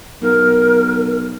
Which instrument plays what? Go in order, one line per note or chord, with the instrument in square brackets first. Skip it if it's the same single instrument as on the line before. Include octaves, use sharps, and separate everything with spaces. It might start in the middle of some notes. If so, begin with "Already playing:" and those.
[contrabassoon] B1 [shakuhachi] A#4